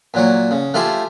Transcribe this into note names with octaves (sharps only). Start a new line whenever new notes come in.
A#2 F#3 C#5
C#3
A3 F4 G4 C5 G#5